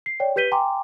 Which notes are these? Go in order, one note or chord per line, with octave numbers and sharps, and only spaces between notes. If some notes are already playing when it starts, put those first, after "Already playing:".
C7
C#5 D5 G5
G4 B4 G6 B6 D#7 G7
G5 G#5 A#5 C6 D6